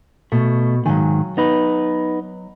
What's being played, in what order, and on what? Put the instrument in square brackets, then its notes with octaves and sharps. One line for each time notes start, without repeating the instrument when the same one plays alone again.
[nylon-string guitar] B2 [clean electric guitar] A3
[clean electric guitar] G#2 D#3 [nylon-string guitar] F#3 F5 G#5
[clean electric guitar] B3 D#4 B4